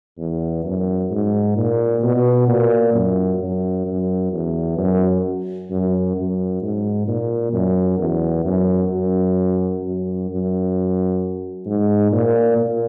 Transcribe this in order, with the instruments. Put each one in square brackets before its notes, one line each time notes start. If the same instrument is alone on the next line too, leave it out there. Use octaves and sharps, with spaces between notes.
[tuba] E2
F#2
G#2
A#2
B2
A#2
F#2
F#2
F#2
E2
F#2
F#2
F#2
G#2
A#2
F#2
E2
F#2
F#2
F#2
F#2
G#2
A#2
A#2